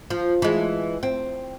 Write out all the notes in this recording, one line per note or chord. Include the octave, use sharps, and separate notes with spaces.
F3
E3 G#3
C4